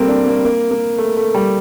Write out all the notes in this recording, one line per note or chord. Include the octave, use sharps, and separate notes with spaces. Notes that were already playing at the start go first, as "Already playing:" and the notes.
Already playing: G3 A3 A#3 C4
D4
A#3
A#3
A#3
A3
A3
G3